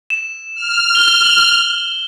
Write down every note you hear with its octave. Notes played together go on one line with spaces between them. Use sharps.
E7
F6
G7
F#7